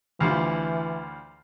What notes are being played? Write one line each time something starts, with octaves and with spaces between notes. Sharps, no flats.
D2 E3 F3 G3